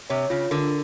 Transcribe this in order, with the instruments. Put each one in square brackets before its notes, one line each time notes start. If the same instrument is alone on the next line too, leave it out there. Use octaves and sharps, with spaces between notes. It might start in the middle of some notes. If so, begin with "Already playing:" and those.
[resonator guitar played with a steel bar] C3 [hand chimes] C#5
[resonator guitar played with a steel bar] C#3 [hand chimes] F4
[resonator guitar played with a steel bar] D3 [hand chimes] A#4